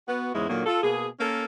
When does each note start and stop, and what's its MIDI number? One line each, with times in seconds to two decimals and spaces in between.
0.08 0.31 59
0.08 0.31 66
0.33 0.48 40
0.33 0.48 44
0.33 0.48 49
0.33 0.48 56
0.33 0.48 64
0.49 0.62 46
0.49 0.62 50
0.49 0.62 51
0.49 0.62 54
0.49 0.62 58
0.66 0.81 65
0.66 0.81 69
0.83 1.07 47
0.83 1.07 58
0.83 1.07 68
1.19 1.44 58
1.19 1.44 61
1.19 1.44 69
1.19 1.44 70